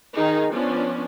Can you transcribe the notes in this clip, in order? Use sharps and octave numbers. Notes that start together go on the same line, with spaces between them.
D#3 D#4 G#4
F3 B3 C#4 D4